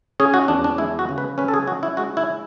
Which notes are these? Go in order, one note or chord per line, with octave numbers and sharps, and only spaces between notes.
C#4 G#4
F#4
E2 D4
D4
G#3 E4
F#4
C#3
B4
C#4 B4
A4
G#4
C#4 F#4
E4
G#3 F#4
E4